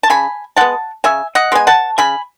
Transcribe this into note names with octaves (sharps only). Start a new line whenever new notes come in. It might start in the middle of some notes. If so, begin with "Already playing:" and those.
A5
C#3 G#5 B5
G#3 B3 F#5 A5
C#3 E5 G#5
D#5 F#5
G#3 B3 G#5
F#5 A5
C#3 G#5 B5